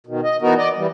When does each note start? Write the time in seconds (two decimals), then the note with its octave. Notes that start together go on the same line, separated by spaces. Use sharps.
0.07 B2 D#3
0.23 D#5
0.42 E3 B3 D#4 F#4 A#4
0.57 D5 D#5
0.76 E3 G3